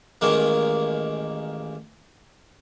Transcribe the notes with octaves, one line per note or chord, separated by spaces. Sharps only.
A1 D#3 G#3 A#3